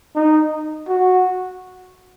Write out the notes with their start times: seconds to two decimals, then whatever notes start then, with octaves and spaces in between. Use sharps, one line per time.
0.15 D#4
0.88 F#4